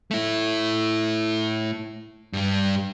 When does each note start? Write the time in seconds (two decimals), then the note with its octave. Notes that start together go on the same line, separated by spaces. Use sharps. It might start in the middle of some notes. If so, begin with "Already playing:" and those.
0.11 A3 E4
2.33 G2 G3